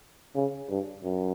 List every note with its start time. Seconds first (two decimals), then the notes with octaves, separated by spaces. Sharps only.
0.35 C#3
0.69 G2
1.04 F#2